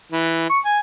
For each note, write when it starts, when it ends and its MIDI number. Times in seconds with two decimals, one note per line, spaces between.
0.12 0.45 52
0.50 0.59 85
0.65 0.79 80